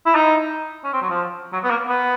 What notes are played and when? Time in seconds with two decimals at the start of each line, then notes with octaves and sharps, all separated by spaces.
0.06 E4
0.15 D#4
0.84 C#4
0.93 C4
1.02 F#3
1.09 F3
1.53 F#3
1.64 B3
1.70 A#3
1.88 B3